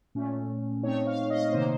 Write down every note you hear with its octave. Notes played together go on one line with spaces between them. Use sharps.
A#2 A3 C#4
A#2 A3 C4 D#4 C#5
F5
D#5
C3 D#3 A#3 D#4 C5